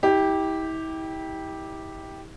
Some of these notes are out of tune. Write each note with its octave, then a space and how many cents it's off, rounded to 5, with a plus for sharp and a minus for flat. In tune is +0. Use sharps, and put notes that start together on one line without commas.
E4 -40 G4 +0